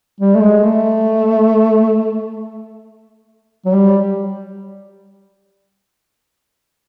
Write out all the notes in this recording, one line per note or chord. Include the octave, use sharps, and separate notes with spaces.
G3
A3
G#3
A3
F#3
G3